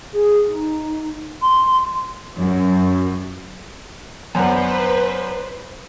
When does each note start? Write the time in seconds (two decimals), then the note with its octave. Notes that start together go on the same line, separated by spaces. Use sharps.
0.13 G#4
0.48 D#4
1.42 C6
2.38 F#2
4.35 F#2 B3 D4 B4 C5